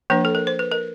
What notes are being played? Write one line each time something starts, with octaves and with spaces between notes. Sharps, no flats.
F3 A#3 D4 B4
A4
A#4
C5
B4
A#4